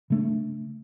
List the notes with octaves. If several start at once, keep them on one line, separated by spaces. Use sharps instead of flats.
C#3 A3 D4